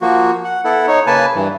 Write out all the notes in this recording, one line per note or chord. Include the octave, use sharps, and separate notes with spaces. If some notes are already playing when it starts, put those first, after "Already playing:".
F3 A#3 F#4
F#5
B3 E4 A4 F#5
D#4 C#5
C#3 A#3 B4 G#5 A5
G2 E3